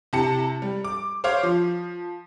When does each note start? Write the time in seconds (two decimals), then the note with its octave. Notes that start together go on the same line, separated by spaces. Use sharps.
0.13 C3 E4 A5 C#7
0.62 G3
0.85 D6
1.24 C5 C#5 F5 D6
1.43 F3